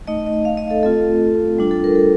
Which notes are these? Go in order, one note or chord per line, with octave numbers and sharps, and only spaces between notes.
A3 D#4 D#5
D#5
F5
D#5
A4
A3 C4 F4 A4
G3 D4 F4
A4
A#4
A4